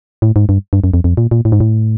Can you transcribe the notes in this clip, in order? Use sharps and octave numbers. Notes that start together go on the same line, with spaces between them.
A2
G#2
G2
G2
F#2
F2
F2
A#2
A#2
A2
G#2
A2